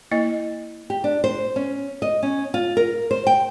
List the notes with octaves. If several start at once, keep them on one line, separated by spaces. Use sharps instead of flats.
A#3 E4 D#5
G4
D4
C5
C#4
D#5
C#4
F4
A#4
C5
G5